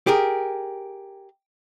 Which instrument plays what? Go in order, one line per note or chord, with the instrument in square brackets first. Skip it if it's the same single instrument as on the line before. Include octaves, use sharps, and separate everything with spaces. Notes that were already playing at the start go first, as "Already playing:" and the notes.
[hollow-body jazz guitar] G4 G#4 A#4